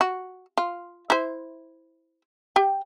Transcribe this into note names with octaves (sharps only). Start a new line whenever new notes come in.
F#4
F4
E4 C5
G4 G5